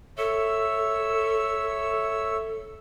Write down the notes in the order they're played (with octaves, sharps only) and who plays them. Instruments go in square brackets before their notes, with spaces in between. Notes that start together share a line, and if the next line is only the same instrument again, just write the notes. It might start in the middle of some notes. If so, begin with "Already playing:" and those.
[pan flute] A4 [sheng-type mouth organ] C#5 E5 E6